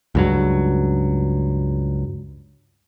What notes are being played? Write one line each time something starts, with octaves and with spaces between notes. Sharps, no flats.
C#2 G2 F#3